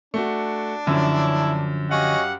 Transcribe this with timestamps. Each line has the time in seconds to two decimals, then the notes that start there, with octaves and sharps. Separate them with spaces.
0.14 A3 D4 F#4
0.87 F#2 D3 F3 C#4 E4
1.91 C#4 F#4 G4 D#5 F5 F#5